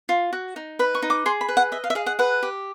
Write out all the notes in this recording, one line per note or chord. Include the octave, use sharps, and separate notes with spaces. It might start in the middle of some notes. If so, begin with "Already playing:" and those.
F4
F#4
D#4
B4 B5
C#6
D#4
D6
G#4 C6
B5
B4
F#5
D#5 E5
F5
E5
G#4 F5
F#5
B4 F#5
G4